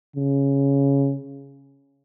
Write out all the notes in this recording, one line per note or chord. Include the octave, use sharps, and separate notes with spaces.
C#3